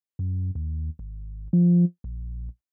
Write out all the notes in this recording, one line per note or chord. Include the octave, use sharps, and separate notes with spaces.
F#2
D#2
G#1
F3
A#1